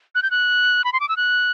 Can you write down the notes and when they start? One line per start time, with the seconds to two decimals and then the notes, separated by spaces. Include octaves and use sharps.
0.15 F#6
0.23 G6
0.31 F#6
0.84 B5
0.93 C6
1.00 D6
1.09 E6
1.17 F#6